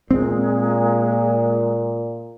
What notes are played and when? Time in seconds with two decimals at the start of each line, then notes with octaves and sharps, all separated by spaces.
0.11 A#2 G#3 C4